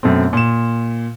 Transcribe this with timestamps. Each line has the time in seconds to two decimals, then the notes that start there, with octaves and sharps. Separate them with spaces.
0.03 F#2 B2 A3 C4
0.33 A#2 E7